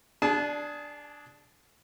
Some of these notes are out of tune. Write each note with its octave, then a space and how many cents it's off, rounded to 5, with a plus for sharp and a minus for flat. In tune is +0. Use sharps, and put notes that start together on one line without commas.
D4 +0 G#4 +10 A5 -30